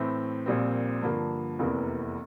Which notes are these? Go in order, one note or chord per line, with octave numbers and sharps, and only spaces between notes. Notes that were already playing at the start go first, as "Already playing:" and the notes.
Already playing: A2 E3 A3 C4
A#1 A#2 G3 C4
G2 D3 F3 A#3
F1 E2 C3 E3 A#3